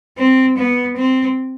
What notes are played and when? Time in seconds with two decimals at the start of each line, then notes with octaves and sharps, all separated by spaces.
0.18 C4
0.58 B3
0.97 C4